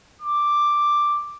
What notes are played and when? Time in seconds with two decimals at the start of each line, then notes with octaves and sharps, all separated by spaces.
0.21 D6